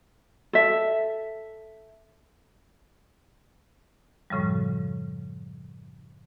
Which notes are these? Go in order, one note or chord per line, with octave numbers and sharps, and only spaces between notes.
A4 E5
F#2 A2 C#3 F3 G3